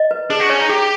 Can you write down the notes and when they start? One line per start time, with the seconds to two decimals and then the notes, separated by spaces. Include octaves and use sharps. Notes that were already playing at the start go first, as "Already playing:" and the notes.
Already playing: D#5
0.11 B4
0.30 D4 G#4
0.40 F#4
0.50 C#4 C#5
0.60 D#4
0.69 G4 G#4